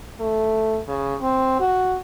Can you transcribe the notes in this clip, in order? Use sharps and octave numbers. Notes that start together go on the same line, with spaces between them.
A3
C#3
C4
F#4